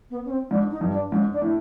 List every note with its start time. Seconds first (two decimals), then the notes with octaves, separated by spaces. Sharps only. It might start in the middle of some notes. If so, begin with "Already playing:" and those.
0.10 B3
0.25 C#4
0.30 C4
0.50 G#2 D4
0.70 D#4
0.81 G2
0.92 D4
1.11 G#2 C#4
1.32 D4
1.42 A2